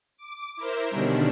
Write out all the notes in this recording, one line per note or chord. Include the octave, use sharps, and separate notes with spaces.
D6
E4 A#4 C5
B2 D3 D#3 G3 C#4 D4